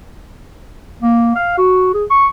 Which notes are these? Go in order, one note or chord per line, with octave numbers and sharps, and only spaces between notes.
A#3
F5
F#4
G#4
C#6